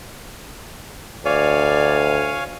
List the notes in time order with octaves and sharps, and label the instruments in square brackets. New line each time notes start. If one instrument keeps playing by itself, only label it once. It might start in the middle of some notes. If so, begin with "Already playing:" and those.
[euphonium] D2 [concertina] C#5 F5 G#5 [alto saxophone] D5